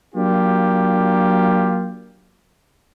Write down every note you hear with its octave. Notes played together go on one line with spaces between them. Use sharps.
F#3 A#3 D4 F4 G4